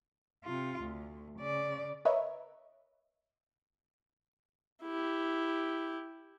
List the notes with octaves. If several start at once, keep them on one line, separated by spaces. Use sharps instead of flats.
C3 F4
D2
C#3 D5
A#4 B4 C#5 D#5 E5
E4 G4